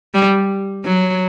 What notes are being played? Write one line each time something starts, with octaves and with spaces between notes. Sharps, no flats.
G3
F#3